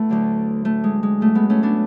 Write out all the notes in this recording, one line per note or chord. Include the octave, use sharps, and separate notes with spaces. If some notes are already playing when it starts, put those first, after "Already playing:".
Already playing: A2 A3 B3 E4
D2 D3 F#3
A3
G#3
G#3
G#2 F#3 A3
G#3 B3
A3 C#4
B3 D4